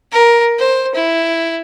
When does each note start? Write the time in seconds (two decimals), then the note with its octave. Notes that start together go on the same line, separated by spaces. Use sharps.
0.12 A#4
0.59 C5
0.95 E4